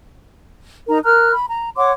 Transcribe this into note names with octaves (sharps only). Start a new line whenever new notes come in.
D#4 A#4 A#5
A#4 A#5 F6 F#6
B5
A#5
C#5 F#5 C6 D6